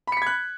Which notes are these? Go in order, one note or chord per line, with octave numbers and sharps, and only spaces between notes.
B5 F#6 G#6 B6 C#7